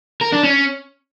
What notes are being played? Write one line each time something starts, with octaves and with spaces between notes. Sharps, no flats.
A#4
D4
C#4